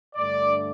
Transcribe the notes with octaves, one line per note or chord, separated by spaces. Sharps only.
G2 D3 A3 D5